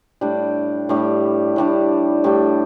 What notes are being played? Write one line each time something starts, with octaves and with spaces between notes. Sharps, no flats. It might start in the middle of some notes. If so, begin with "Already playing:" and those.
A2 G3 D4 G4
A2 G3 D4 G4
A2 G3 D4 G4
A2 G3 D4 G4